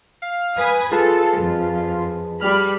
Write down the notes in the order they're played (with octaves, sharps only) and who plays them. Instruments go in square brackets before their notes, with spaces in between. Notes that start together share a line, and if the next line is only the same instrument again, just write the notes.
[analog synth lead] F5
[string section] B4 G#5 D#6
[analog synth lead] F4 [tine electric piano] G#4 B4 A5 [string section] A4
[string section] F2
[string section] G3 B5 [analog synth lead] F6